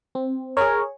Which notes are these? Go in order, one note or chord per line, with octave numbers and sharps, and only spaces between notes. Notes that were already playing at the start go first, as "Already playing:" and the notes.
C4
G#4 A#4 C#5